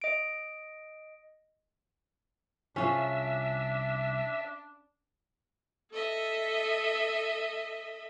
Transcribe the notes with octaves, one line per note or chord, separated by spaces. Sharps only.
D#5 D7
C2 C#4 D4 F4 G#4 E5
A4 D#5 E5